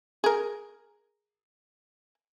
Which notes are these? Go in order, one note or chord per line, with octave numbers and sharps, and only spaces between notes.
G#4 A#4